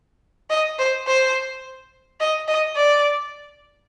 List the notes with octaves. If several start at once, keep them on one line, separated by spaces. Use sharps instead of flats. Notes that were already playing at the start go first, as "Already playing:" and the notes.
D#5
C5
C5
D#5
D#5
D5